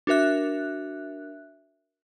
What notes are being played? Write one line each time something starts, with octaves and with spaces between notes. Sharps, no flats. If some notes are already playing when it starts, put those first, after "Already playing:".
D4 F#4 A#4 E5 F#6